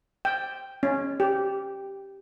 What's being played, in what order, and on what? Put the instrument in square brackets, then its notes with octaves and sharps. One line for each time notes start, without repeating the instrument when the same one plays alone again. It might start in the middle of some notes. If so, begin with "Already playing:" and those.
[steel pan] G5
C#4
G4